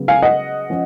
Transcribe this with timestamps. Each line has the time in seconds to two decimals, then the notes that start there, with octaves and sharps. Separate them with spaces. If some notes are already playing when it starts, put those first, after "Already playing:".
Already playing: C#3 F#3 B3
0.08 F5 G#5
0.22 D#5 F#5
0.70 F3 C#4